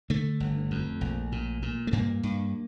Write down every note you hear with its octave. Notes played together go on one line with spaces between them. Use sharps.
D3 A3
G1
F2
A#1
A#2
A#2
A3
G2 A#3
G2